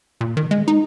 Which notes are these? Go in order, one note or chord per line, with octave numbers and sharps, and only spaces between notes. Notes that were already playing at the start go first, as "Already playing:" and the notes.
A#2
D#3
G#3
D#4